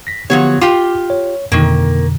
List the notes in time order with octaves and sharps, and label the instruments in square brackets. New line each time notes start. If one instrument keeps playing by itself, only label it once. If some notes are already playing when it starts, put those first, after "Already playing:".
[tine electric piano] A#6 B6
[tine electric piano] D3 B3 G4 [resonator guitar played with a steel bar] F3 F#3 C#5
[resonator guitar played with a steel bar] F4 G4 [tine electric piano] D6
[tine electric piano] C#5
[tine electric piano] F2 B2 D3 [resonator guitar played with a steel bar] D#3 A#3